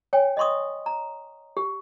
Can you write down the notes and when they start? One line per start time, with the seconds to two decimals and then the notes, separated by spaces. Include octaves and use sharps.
0.13 C#5 G5 G#5
0.37 D#5 E5 C6 C#6 D#6
0.86 A#5
1.57 G4